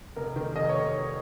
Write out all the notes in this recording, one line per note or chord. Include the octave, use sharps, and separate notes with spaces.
F1 A#4
D#3
F1 D#5
C#5